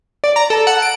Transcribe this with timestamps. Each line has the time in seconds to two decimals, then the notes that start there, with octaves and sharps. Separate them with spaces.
0.24 D5
0.36 A#5
0.50 A4
0.67 F#5
0.82 D7